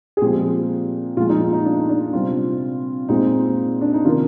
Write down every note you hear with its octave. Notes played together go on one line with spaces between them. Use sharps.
G#4
A#2 F3 G#3 C4 G4
A#2 F3 G#3 F4
D#4
D#4
D#4
D4
D#4
D4
C3 G3 C4 F4
A#2 G#3 C4 D#4
D4
D#4
C3 D#3 A#3 F4